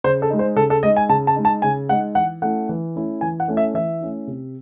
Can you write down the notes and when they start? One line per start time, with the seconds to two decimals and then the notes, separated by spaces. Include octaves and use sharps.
0.04 C#3 C5
0.22 A4
0.30 G#3 D#4
0.39 C5
0.56 C#3 A4
0.70 A4
0.83 G#3 D#4 D#5
0.96 G#5
1.09 C#3 A5
1.27 A5
1.36 G#3 D#4
1.45 A5
1.62 C#3 G#5
1.89 G#3 D#4 F#5
2.15 E3 F#5
2.42 A3 C#4 E4 F#5
2.69 E3
2.95 A3 C#4 E4
3.21 E3 G#5
3.40 F#5
3.48 A3 C#4 E4
3.57 E5
3.74 E3 E5
4.01 A3 C#4 E4
4.27 C3